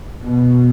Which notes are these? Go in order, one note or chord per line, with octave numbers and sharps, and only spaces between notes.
B2